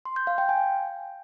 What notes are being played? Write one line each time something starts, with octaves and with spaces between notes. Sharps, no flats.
C6
G6
F5
G5
G#5